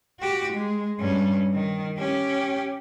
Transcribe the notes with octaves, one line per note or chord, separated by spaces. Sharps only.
F#4 G4
G#3
G2 C#4
D#3
C#4 G4